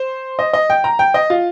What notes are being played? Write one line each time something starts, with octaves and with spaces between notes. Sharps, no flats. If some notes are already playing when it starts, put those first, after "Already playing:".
Already playing: C5
D#5
D#5
G5
A#5
G5
D#5
F4